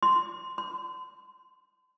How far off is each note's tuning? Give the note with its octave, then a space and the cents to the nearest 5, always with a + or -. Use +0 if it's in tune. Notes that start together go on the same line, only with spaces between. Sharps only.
C6 -10
C6 -40